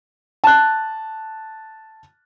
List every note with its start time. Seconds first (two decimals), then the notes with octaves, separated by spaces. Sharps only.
0.44 A5 F#6